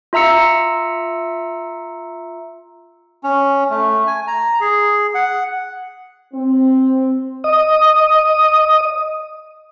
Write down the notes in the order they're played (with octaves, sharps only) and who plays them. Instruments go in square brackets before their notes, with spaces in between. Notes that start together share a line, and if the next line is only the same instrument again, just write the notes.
[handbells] F4 E5 A#5 E6 C#7
[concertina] C#4
A3
G#5
A#5
G#4
F#5
[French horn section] C4
[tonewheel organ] D#5 D#6